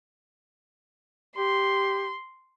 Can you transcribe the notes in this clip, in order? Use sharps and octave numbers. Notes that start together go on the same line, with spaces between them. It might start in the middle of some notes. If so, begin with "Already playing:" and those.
G4 C6